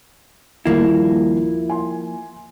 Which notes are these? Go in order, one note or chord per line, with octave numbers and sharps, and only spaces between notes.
D#1 A#1 F3 G3 A#3 E4
G#5 C6